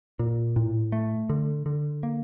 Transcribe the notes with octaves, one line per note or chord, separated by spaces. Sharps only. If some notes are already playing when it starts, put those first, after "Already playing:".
A#2
A2
A3
D3
D3
A#3